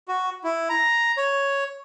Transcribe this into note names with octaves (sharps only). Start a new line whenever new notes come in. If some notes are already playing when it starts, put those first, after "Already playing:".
F#4
E4
A#5
C#5